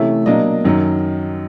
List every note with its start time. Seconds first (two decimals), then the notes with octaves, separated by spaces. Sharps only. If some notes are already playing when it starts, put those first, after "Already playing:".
Already playing: C3 E3 A3 C#4 E5
0.26 B2 F#3 A#3 D4 D#5
0.65 F#2 D#3 F#3